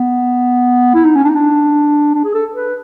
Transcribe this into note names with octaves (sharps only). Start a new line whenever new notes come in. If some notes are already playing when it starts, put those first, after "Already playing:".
Already playing: B3
E4
D#4
C#4
D4
D#4
D4
D4
G#4
A4
B4